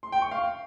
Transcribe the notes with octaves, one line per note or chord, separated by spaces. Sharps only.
C6
G5
C#6
F5